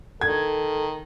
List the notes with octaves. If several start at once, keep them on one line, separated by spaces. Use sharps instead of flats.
D#3 A4 G#6